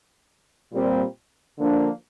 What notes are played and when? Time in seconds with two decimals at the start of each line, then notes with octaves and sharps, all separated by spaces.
0.72 A#2 G3 C4
1.58 D3 F3 A#3 D4